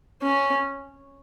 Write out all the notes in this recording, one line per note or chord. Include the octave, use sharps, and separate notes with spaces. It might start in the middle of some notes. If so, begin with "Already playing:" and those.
C#4